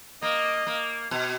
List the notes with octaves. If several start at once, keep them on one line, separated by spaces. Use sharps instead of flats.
A#3 D#5
A#3
B2